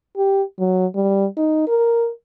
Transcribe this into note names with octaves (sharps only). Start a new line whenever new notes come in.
G4
F#3
G3
D#4
A#4